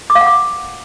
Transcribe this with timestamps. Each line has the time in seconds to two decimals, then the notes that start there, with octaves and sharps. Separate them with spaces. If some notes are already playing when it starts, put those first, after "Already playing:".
0.10 D6
0.15 F5
0.21 F#5
0.27 D6